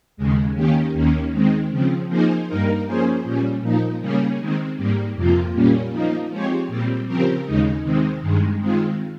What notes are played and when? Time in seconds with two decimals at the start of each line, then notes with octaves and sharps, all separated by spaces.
0.17 D#2 C#3 G#3
0.55 D#3 A#3 C#4 G4
0.93 D#2 D#3 A#3 C#4
1.31 D#3 G#3 C4
1.70 C#3 F3 C4
2.08 F3 A#3 D#4 G#4 C5
2.47 G2 G3 A#3 D#4 A#4
2.85 F3 A#3 C#4 G#4 C5
3.23 A#2 G3 C#4
3.61 A#2 F3 A#3 D#4
4.00 C#3 G3 A#3 C#4 G#4
4.39 D#3 G#3 C4
4.76 G#2 G3 A#3
5.15 F2 C3 F3 A#3 F4
5.53 A#2 G3 A#3 C#4
5.92 F3 A#3 D#4
6.31 F3 G#3 C4 G4 C#5
6.68 A#2 G3 C4
7.07 C#3 F3 C4 G4 A#4
7.45 D#2 C#3 G#3 D#4
7.83 C3 D#3 G#3 C4
8.22 G2 D#3 G#3
8.60 D#3 G#3 C4 F4